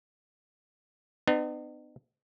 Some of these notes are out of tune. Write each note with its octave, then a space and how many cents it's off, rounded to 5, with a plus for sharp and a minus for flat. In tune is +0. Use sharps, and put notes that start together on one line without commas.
B3 +35 D#4 -45